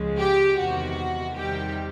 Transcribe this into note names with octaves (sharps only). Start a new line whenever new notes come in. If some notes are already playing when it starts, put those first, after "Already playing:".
Already playing: C#2 C#3 F3 G#3
G4
E2 C3 D#3 F#4
E2 C3 D#3 G3 G4